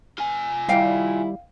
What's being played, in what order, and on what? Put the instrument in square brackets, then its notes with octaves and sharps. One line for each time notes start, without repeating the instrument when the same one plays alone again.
[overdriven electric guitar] F4 G#5
[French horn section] D#3 E4 [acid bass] G3 [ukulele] D#5 F5 G5